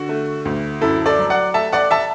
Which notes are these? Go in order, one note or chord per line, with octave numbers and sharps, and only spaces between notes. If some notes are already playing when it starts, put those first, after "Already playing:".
Already playing: D3 F#4
A3
D2
F#2 E4 A4
A4 D5
F#3
D5 F#5
A3 E5 A5
D5 F#5
E5 A5